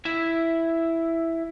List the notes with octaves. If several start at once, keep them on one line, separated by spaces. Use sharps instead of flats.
E4 E5